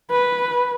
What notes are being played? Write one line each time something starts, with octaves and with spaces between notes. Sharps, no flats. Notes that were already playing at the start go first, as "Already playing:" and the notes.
B4